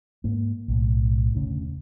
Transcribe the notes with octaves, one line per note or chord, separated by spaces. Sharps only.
G#2 A#3
B1 A2
E1 D2 C#3 C#4